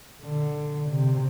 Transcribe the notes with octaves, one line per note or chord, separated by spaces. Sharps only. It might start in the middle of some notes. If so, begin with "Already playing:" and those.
D3
C3